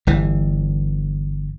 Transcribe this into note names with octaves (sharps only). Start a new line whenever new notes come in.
G1 E3